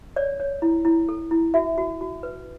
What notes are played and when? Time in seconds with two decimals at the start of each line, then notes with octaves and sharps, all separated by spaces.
0.16 C#5 D5
0.40 C#5
0.62 E4
0.85 E4
1.09 A4
1.31 E4
1.54 F#4 E5
1.78 F#4
2.01 F#4
2.23 B4